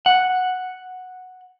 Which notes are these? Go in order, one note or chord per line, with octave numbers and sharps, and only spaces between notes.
F#5